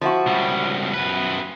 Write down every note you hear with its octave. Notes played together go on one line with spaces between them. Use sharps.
F3 E4 F#4
C#2 G3
F#2 B4